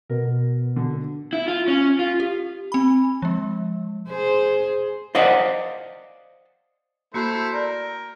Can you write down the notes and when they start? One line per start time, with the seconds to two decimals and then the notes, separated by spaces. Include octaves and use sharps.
0.10 B2 A#4
0.76 D3
1.33 E4
1.48 F4
1.68 C#4
1.99 F4
2.20 G4
2.72 C4 B5
3.22 F3 G#3
4.09 G#4 C5
5.15 C5 D5 D#5 F5 F#5
7.14 A3 A#3 E4 F#4 C5
7.53 A#4 D5